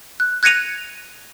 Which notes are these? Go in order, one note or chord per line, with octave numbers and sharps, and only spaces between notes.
F#6
F#6 G#6 A#6 C#7 D#7 F7